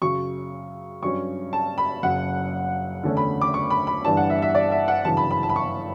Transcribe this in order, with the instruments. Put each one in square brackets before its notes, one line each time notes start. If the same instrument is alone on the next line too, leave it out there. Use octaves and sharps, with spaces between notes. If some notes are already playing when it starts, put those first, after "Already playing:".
[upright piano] F#2 C#3 F#3 C#6
G2 F#3 C#4 C#6
A5
B5
F#1 F#2 C#3 F#5
E2 D3 A3 C#4
B5
D6
C#6
B5
B5
G1 G2 E3 G3 D4 A5
F#5
E5
E5
D5
E5
F#5
G1 F#2 C#3 E3 A5
B5
B5
A5
B5
C#6